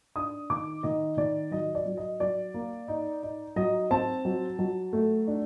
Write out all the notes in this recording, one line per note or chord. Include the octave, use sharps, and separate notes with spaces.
D4 D#6
D#3 D6
D#3 D#5
D#3 D5
F#3 D#5
D5
F#3
D#5
F#3 D5
A#3
D#4
D#4
F#3 D#5
C4 A5
F#3
F#3
A3
D4